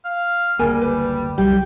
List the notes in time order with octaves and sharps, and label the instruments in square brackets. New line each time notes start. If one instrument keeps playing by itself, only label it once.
[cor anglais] F5
[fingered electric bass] F#1 D2 A#3 [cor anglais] G3 [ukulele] G#4 A#4 G#5
[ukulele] B4
[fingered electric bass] C2 [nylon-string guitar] G3 [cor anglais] G5